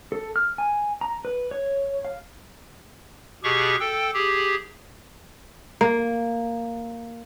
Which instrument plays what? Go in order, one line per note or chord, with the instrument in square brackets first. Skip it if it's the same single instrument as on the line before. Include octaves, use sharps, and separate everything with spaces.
[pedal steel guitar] A4
F6
G#5
A#5
B4
C#5
F5
[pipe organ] B2 G4 G#4 C#6
A4 G5
G4 G#4
[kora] A#3